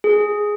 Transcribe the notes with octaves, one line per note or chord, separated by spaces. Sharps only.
G#4